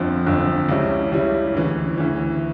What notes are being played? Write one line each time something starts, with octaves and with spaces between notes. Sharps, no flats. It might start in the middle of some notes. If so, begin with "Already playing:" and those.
Already playing: G1 F2 D3 F3
G1 F2 D3 F3
C#2 C#3 G3 C#4 E4
C#2 C#3 G3 C#4 E4
D2 C#3 E3
D2 C#3 E3